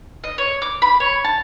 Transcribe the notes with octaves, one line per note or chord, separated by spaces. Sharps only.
D#5
C#5
D6
B5
C#5
A5